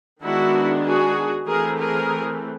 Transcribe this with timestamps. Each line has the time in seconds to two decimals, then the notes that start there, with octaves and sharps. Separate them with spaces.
0.23 D#3 G#3 B3 D4 E4 F#4
0.85 F#4 G#4
1.47 E3 A3 C4 G#4 A#4
1.79 G#4 A#4